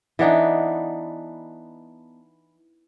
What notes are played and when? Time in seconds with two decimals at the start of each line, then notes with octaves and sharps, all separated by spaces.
0.19 E3 B3 D4 D#4